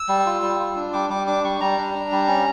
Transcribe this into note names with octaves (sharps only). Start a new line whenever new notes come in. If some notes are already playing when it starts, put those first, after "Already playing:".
Already playing: E6
G3
F4
G3
F4
D4
G3 D6
G3 D6
D4 D6
G3 C#6
G3 A#5
D4
D4
G3
C#4